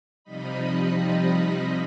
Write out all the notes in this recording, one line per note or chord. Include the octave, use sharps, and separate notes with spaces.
C3 F3 G3 D#4 D#5 B5